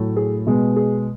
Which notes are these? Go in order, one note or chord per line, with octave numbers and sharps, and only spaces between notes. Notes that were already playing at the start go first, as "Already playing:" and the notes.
Already playing: A2 F#3 A3
G#4
B2 G#3 B3
G#4